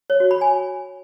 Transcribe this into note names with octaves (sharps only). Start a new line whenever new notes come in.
C#5
F#4
B5
G#5